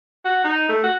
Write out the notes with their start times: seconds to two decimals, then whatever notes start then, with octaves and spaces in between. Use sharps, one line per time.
0.25 F#4
0.44 D#4
0.69 A3
0.83 F#4